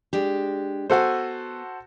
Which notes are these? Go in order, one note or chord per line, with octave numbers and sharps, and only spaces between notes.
G#3 D4 G4
B3 F#4 A4 B4 C5 G#5